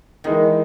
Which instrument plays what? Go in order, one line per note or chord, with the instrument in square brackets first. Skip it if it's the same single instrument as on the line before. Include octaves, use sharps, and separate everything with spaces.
[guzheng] D#3 [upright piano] E3 G#3 D#4